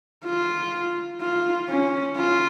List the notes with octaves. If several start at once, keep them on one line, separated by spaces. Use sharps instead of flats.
F4
F4
C#4
F4